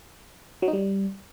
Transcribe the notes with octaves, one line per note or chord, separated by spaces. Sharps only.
F#3
D#4
G3